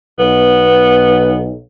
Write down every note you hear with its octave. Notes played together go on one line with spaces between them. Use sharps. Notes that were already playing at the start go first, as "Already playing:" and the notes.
B1 B3